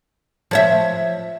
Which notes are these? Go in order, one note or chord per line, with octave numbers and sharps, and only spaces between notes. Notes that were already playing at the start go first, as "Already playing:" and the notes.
F3 C#5 E5